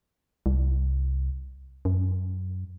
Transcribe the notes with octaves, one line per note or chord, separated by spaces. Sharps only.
C2
F#2